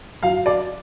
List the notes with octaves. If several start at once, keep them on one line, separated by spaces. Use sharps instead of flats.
F#3 F5
D5